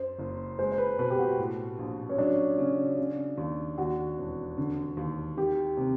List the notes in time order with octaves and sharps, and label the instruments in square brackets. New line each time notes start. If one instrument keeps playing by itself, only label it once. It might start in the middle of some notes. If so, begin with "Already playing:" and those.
Already playing: [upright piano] F#2 [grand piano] C5
[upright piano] F#1
[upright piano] G#3 [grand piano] C5
[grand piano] C5
B4
[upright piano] B2 [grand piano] B4
[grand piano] G4
F#4
[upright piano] A2
A#1
[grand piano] C#4
[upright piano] F#3 [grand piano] D4
[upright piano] C#3
C#3
D#2
[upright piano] D#2 [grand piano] F#4
[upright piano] E1
D3
D#2
[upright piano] D#3 [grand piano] G4
[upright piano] C3